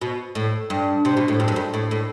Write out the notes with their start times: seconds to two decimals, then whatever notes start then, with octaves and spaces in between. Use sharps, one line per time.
0.01 B2
0.35 A2
0.70 G2
1.05 C3
1.17 B2
1.28 A2
1.40 G2
1.48 F#2
1.56 G2
1.74 A2
1.91 A2